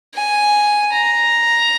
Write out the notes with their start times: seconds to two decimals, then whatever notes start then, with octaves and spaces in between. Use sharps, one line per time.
0.14 G#5
0.92 A#5